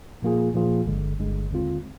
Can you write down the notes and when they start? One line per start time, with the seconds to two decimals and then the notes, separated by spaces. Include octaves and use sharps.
0.22 A#2 F3 A#3 F4 G#4
0.54 A#2 F3 A#3 F4 G#4
0.87 G1 G2 D3 G#3
1.19 G1 G2 D3 G#3
1.51 D#2 D3 G#3 C4 F4